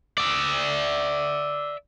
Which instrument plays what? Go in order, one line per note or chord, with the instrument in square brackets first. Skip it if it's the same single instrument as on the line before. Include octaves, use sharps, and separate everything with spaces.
[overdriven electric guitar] D5 E5